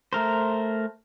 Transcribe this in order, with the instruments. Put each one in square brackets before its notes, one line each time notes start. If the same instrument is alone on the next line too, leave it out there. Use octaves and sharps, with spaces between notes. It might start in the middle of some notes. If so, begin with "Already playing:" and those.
[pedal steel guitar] A3 A#4 C5